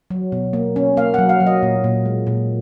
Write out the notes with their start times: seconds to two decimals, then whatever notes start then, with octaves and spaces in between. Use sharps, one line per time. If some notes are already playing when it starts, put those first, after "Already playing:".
0.11 F#3
0.32 B2
0.53 A#3
0.76 C#4
0.97 A#3 F5
1.14 F#3 F#5
1.29 F5
1.40 F#3
1.46 D#5
1.63 A#2
1.84 A#2
2.06 G#3
2.27 A#2